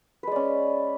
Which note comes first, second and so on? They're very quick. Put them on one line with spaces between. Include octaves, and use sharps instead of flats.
B4 G#3 D5 C#4